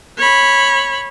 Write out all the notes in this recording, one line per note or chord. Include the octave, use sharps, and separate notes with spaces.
C#5 B5